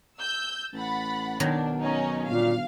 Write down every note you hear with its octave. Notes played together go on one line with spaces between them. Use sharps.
E6 G6
A1 F#5 B5 A6
B1 D#3 F#3 D4
C#4 D#4
G1 A#2 F5